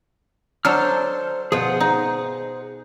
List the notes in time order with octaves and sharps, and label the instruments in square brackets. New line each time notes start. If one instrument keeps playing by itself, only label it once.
[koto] F#3 D4 A4 [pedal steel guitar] C5 A5 F6
[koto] B2 F3 [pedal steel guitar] G#4 C5 F#5
[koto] D#4